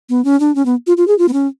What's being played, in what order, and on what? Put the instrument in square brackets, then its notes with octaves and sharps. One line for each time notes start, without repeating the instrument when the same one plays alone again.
[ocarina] B3
C#4
D4
C#4
B3
F4
F4
G#4
F4
B3
C#4